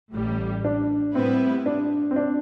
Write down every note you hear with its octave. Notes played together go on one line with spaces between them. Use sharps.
A1 A2 G3
D4
A2 G3 B3 C4 E4 B4
D4
C4
D4